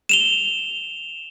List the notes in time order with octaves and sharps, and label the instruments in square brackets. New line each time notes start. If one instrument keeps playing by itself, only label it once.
[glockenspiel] E7 F7 G7